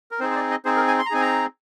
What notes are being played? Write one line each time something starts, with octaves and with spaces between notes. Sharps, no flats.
A#4
C4 D#4 G#4 C5
C5
D5
D#5
C4 D#4 G#4 C5
A#4
G#5
C6
A#5
C4 D#4 G#4 G#5
A#5